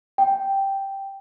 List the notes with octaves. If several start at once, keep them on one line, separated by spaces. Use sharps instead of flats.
G5